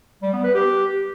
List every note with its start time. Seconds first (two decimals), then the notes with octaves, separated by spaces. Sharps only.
0.22 G3
0.33 B3
0.44 B4
0.54 G4